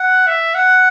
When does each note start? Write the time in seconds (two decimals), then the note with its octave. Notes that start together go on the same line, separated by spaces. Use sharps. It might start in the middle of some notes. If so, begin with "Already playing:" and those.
Already playing: F#5
0.27 E5
0.54 F#5